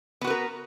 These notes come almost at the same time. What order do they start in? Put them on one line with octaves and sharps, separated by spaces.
B3 F#4 B4 A#4